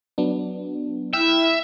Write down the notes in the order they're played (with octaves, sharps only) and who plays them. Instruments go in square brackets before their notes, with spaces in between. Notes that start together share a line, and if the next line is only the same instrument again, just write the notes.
[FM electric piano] F#3 B3 D4
[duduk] E4 [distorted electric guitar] E5 [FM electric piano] G5 F6